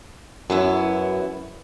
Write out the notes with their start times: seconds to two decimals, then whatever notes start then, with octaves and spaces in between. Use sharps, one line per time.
0.50 F#2 F#3 B3 E4